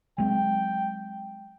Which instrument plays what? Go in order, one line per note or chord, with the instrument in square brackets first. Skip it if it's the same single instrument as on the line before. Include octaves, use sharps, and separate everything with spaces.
[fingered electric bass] F#3 G#3 C4 [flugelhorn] G5